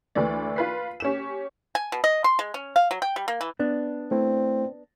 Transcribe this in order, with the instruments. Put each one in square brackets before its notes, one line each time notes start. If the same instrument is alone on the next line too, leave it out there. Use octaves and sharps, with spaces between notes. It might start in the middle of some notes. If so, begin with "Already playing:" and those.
[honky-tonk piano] D2 E3 A3 D5
F4 B4 C7
C#4 G4 E7
[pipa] G#5
B2
D#5
C6
G#3
C#4
F5
F#3
G5
G3
A#3
E3
[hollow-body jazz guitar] B3 D4
[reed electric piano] A3 E4 [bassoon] C4